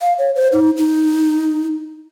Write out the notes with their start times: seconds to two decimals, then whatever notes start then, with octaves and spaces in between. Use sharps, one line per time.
0.02 F5
0.18 C#5
0.36 C5
0.53 D#4
0.77 D#4